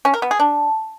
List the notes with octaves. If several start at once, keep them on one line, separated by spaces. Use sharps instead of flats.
C#4
A#4
B3
G#4
D4